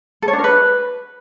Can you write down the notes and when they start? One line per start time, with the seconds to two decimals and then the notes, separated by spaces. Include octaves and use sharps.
0.22 A4
0.28 C#5
0.33 D4
0.39 A#4
0.44 B4